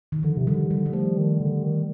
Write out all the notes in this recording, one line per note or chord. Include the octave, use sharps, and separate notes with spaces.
D#3
D3 F3
C3
D3 G3
D3 G3
G3
F3 A3
D#3
D3
D#3